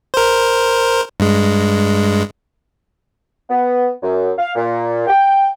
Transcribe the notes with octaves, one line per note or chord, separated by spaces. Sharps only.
A#4 C5
G2 G#3
B3
F#2
F5
A#2
G5